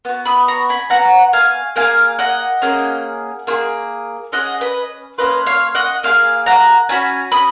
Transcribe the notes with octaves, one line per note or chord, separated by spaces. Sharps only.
B3 F#4
B5 D#6
A#5 C#6
G#5 B5
B3 D#4 F#4 F#5 A#5
F5 G#5
A#3 F4 G#4 F5 G#5
D#5 F#5
A#3 C#4 G#4
A#3 F4 G#4
C#4 F4 G#4 D#5 F#5
B4 D#5
A#3 C#4 F4 B4 D#5
C#5 F5
D#5 F#5
A#3 F4 G#4 F5 G#5
F#5 A#5
C#4 F#4 G#5 B5
B5 D#6